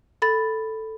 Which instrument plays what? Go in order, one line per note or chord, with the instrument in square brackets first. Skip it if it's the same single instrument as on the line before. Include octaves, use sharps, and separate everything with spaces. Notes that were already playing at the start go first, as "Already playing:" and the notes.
[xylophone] A4 B5 A6